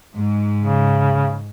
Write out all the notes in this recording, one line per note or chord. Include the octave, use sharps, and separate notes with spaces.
G#2
C#3